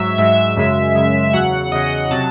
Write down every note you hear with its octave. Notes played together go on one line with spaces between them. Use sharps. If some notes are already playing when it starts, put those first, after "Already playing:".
Already playing: G#2 F#3 E5
G#2 F#3 E5
F#2 C#3 G#3
F#2 C#3 G#3
E2 C#3 F#3 F#5
E2 C#3 F#3 D#5
C3 F#3 A5